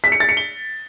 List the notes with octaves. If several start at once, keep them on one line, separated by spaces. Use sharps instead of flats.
B6
C#7
A6
C#7
G7